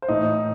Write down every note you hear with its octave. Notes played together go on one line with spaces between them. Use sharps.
C5
A2 E3 D#4 D#5